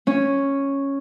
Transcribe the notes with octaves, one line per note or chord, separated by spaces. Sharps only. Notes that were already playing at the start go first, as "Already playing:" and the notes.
C#4